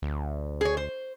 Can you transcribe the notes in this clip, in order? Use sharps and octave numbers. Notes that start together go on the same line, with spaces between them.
D2
G#4 C#5
C5